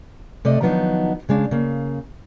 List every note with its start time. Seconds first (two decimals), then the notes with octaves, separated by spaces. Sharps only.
0.45 C3 A3 D5 D#5
0.61 D#3 F3 F#3 B3 D4 D#4
1.29 C#3 G#3 D4 F5
1.51 C#3 A#3